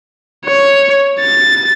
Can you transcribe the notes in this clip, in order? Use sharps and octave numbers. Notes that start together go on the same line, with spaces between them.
C#5
A6